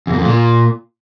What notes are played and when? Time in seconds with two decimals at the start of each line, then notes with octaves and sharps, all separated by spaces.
0.07 E2
0.13 F#2
0.19 F2
0.25 A#2